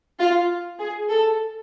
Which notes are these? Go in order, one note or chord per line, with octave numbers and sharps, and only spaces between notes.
F4
G#4
A4